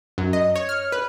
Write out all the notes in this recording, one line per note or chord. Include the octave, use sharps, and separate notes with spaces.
F#2
D#5
C#5
F6
B4